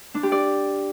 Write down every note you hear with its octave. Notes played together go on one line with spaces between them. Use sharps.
D4
G4
D5